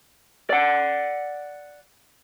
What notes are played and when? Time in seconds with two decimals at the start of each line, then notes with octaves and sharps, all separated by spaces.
0.50 D5 F#5